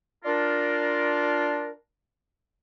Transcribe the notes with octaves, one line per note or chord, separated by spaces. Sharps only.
D4 F4 A#4